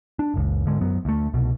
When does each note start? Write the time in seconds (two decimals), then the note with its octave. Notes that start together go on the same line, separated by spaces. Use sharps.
0.19 D4
0.34 F#1 C#2
0.67 G#2 D3 G#3
0.81 F#2 F#3 B3
1.05 D2 A3
1.34 C2 B2